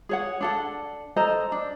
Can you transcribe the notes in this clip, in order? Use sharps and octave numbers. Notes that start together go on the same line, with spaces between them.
G#4 C#5 F#5
D4 A4 F#5
A4 C5 D#5 A#5
D4